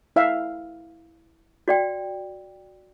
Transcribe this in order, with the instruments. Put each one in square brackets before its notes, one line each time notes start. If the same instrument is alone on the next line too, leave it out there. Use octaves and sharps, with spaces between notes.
[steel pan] E4 E5 F5
[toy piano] F#4 D5 G5